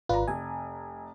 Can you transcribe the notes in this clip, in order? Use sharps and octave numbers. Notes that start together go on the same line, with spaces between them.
G#1 F4 B4 D5 A#5
F1 G#5